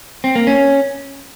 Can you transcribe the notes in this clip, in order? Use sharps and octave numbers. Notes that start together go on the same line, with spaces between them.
C4
A#3
C#4